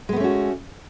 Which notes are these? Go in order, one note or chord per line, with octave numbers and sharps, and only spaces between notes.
G#3 A3 B3 C#4 F#4